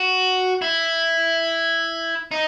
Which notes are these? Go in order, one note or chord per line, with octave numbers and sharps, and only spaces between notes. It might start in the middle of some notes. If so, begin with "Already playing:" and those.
Already playing: F#4
E4
D#4